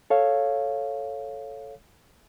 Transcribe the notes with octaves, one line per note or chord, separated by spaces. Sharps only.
A4 C#5 F5